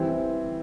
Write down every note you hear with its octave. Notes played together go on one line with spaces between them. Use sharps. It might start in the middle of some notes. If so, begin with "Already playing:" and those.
Already playing: E3 G3 C4